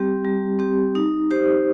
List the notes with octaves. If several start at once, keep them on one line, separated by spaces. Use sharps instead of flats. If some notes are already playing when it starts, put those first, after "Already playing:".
Already playing: G3 C4 G4
G3
C4 G4
D#4
G4 C5